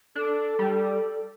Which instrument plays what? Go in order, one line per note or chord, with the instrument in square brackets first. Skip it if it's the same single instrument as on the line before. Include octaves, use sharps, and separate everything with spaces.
[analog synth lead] D4 [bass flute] A4
[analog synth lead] G3